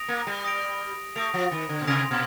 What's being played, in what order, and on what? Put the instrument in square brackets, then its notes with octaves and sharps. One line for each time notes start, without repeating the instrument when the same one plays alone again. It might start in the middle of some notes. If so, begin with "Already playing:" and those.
Already playing: [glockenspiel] D#6 A#6 D7 F7
[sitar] A#3
G3
[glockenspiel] D#6 A#6 D7 F7
[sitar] A3 [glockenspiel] D#6 A#6 D7 F7
[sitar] F3
D#3
D3
A#2
[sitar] C3 [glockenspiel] D#6 A#6 D7 F7
[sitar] A#2